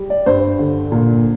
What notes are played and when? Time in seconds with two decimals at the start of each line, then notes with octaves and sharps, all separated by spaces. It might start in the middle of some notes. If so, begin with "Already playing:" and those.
Already playing: G3
0.10 D5
0.26 G2 C5
0.59 D3
0.92 A#2